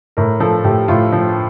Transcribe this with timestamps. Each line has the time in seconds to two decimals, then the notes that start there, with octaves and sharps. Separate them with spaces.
0.17 A2 A#4
0.40 F3 A4
0.64 A2 G4
0.88 A2 F4
1.13 F3